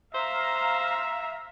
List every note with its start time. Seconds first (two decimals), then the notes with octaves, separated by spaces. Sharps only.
0.15 C5 E5 F5 A#5